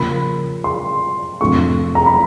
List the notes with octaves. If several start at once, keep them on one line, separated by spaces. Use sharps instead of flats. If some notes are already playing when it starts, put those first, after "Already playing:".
Already playing: C#3 F3 A#3 B5
C6
F2 C3 F3 A3 D4 C#6
A#5
B5